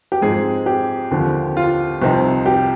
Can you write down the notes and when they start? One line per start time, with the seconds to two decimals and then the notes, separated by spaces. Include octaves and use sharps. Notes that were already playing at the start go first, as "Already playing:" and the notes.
0.12 G4
0.21 G#2 F3 G#3 C4 D#4 G#4
0.66 G4
1.11 D#2 D3 F3
1.57 F4
2.02 C2 C3 F3 C4 D#4
2.46 G4